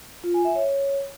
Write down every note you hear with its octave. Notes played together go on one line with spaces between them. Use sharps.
F4
G#5
E5
C#5